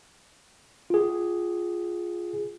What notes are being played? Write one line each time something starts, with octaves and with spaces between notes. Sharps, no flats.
F4 G#4